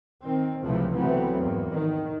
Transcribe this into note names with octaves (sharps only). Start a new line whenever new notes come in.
D#3 C4
C#2 A2 C3 E3 F3 A3
E3 F#3 A3 B3 C4
E2 G#2 A#3
D#3